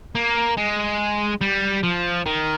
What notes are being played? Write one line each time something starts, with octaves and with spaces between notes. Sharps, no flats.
A#3
G#3
G3
F3
D#3